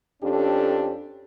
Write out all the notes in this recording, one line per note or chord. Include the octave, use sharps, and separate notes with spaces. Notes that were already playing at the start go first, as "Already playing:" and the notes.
F2 C#4 D4 G4 A4